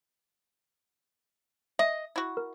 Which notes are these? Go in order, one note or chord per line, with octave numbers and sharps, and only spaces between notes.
D#5 E5
E4 F#4
A#4